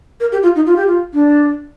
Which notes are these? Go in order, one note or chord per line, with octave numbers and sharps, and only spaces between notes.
A#4
G4
F4
D#4
F4
G4
F4
D4